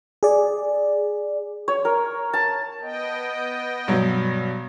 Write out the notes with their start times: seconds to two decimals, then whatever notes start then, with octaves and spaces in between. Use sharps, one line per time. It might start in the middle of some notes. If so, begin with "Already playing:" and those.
0.23 G#4 D5
1.68 C#5
1.85 A#4
2.33 A5
2.82 B3 D#5 G5
3.88 G2 B2 F#3